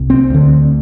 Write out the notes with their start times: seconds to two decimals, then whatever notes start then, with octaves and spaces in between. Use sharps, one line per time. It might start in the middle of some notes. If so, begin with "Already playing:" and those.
Already playing: C2 C3
0.10 C4
0.30 D2 D3